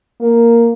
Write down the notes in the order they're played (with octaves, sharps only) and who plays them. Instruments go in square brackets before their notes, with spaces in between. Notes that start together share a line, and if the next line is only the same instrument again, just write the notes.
[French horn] A#3